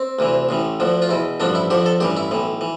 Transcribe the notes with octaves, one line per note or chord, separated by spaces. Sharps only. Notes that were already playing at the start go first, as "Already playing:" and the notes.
Already playing: C4
D2 C3 E3
A1 A2 E3
D2 D3 F3
F4
E2 B2 E4
A1 G2 D3 F3 D4
E4
F2 D3 F3 G4
A4
A1 G2 E3 G4
E4
B1 A2 E3
E3